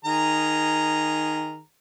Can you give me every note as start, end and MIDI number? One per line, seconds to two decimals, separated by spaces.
0.05 1.59 51
0.05 1.59 68
0.05 1.59 82